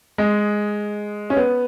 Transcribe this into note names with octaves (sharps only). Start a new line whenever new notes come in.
G#3
C#4
B3